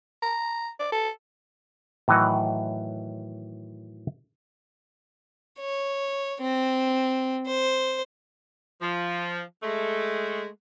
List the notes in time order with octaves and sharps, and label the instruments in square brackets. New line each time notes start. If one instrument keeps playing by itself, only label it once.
[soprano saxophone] A#5
D5
A4
[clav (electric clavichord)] A2 D#3 E3 F#3 D#5 F#5
[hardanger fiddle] C#5
C4
C5
[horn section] F3
G#3 A3